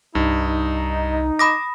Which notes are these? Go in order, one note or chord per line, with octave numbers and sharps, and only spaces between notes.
C2 G2 D#4
B5 D6 D#6 A#6